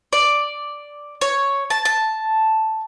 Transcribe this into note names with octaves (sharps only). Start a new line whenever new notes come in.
D5
C#5
A5
A5